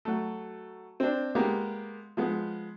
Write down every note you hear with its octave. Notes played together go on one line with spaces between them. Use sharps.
F#3 A3
C4 D4
G#3 A#3 B3 G4
F3 G#3 B3